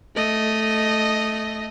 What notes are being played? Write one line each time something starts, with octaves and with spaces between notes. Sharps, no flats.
A3 D#5